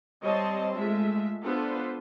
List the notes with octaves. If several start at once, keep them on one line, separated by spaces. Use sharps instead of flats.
G3 C4 C#5 D#5 A5 C6
G#3 A3 F4 E5
B3 D4 F4 A4 B4 C5